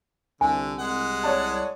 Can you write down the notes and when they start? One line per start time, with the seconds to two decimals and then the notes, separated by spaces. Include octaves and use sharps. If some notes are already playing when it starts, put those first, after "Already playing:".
0.41 C2 D3 G#5
0.79 G#3 F#5
1.24 C#5 D5 A5